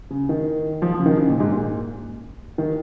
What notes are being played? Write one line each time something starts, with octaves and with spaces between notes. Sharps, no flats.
C#3
D#3
F3
F3
C#3
D#3
C#3
A#2
G#2
A#2
D#3